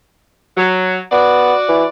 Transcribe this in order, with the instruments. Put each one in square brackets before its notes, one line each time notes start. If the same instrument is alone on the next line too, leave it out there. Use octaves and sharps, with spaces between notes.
[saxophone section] F#3
[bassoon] B3 [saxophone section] F#4 D5
[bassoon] E3